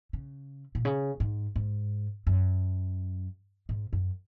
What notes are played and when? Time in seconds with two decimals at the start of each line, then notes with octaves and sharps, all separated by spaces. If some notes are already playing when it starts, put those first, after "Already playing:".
0.13 C#3
0.75 A#2
0.85 C#3
1.20 G#2
1.56 G#2
2.27 F#2
3.69 G#2
3.93 F#2